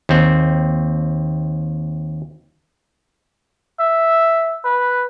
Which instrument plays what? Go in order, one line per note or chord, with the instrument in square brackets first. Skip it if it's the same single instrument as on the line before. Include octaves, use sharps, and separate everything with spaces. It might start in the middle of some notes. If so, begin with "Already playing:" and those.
[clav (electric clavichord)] D#2 C4
[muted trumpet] E5
B4